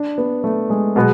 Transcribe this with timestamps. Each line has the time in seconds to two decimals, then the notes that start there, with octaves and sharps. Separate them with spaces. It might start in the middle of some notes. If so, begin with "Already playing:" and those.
Already playing: D4
0.18 B3
0.44 A3
0.70 G#3
0.96 B2 F#3 G#3 B3